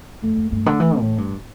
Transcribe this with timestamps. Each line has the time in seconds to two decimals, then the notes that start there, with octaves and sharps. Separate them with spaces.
0.23 F2 A3
0.37 F2
0.51 G2 A3
0.66 D3
0.80 E3
0.99 A2
1.18 G2